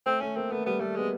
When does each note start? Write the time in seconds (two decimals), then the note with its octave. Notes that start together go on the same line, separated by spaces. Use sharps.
0.06 A3 C4
0.21 A3 C#4
0.36 A#3 C4
0.52 A3 B3
0.66 G3 B3
0.81 G3 A3
0.96 G#3 B3